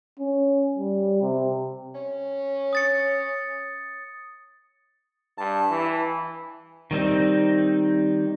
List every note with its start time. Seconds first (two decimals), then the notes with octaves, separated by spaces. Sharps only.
0.19 C#4
0.78 G3
1.22 C3
1.95 C#4
2.73 D#6 A6 C#7
5.38 G2 A5
5.70 E3
6.91 D#3 G3 C4 D#4